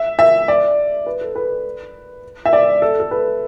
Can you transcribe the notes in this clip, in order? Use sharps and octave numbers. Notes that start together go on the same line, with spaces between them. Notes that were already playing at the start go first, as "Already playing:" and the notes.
Already playing: E5
E5
D5
B4
A4
B4
E5
D5
A4
A4
B4